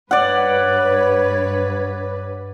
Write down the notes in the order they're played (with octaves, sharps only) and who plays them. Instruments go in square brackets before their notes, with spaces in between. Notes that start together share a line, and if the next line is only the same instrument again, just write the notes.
[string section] G2 B4 [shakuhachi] C#5 [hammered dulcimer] D5 F#5